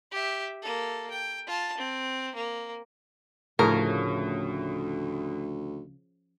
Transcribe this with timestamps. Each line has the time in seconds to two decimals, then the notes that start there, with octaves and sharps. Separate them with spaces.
0.12 G4 E5
0.62 A#3 A4
1.10 G5
1.47 F4 A5
1.77 C4
2.35 A#3
3.59 D2 A2 C#3 F3 A#4 C#5